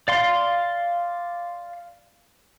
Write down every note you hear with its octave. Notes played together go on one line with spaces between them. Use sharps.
D5 F5 C6